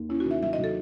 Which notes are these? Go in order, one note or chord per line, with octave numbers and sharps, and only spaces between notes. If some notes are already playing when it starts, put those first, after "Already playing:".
Already playing: D#2
C#4 E4
F#4
D#3 E5
F#3 E5
D#5
F#3
A4